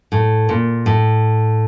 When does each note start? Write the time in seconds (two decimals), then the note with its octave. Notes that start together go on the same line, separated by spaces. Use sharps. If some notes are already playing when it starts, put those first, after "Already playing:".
0.12 A2
0.49 A#2
0.86 A2